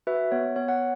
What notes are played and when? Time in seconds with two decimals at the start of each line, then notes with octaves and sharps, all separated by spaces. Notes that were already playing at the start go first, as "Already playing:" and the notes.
0.07 F#4 B4 E5
0.32 B3 C#5
0.56 B3 C#5
0.68 C#5 F#5